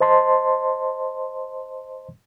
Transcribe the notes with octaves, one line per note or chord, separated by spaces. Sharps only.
C5 D#5 A5 C6